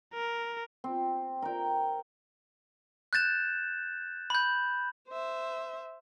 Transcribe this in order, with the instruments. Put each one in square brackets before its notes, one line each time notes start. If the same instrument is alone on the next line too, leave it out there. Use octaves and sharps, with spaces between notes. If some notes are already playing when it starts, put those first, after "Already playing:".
[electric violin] A#4
[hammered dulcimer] C4
A#4 G5
[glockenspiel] F#6 G6 A6 E7
B5 G6
[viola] C5 E5